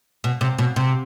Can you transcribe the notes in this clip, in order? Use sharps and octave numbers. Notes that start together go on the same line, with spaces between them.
B2
C3
B2
C3